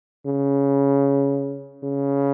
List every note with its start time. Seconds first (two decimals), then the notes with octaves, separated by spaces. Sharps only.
0.26 C#3
1.83 C#3